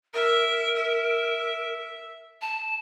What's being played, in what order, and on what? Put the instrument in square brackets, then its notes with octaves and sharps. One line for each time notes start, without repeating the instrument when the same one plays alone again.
[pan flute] A#4 [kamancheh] E5
[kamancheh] E5
[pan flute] A5